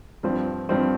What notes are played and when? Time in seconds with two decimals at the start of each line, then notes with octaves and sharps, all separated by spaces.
0.23 G2 F3 C4
0.69 G2 F3 C4